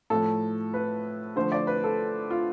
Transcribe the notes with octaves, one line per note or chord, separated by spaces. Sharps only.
A2 F3 A3 A4
B4
D3 F3 A3 C5
D5
B4
A4
F4